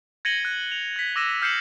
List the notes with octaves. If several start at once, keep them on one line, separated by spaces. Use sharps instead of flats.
G#6 A#6 C#7 D#7 F#7 G7
F#6 A#6
F7
G#6 B6
D6 E6 A#6 D#7 E7
F6 G6 C7 C#7 E7 F#7